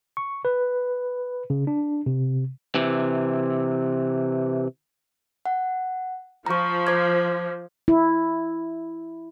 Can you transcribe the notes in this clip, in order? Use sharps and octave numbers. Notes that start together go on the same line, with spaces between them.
C#6
B4
C#3
D4
C3
C3 E3
F#5
F3 A#5 C#6
C5 D6 G#6
E4